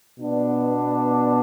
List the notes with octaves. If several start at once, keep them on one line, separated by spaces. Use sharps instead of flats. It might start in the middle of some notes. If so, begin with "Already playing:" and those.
B2 B3 D4